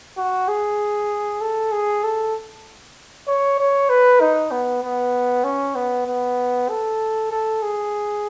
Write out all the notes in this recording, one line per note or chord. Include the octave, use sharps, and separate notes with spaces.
F#4
G#4
A4
G#4
A4
C#5
C#5
B4
D#4
B3
B3
C#4
B3
B3
A4
A4
G#4